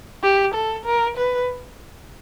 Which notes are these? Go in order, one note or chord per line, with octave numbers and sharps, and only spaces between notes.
G4
A4
A#4
B4